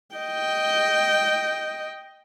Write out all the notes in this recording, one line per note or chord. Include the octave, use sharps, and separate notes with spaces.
D#5 G5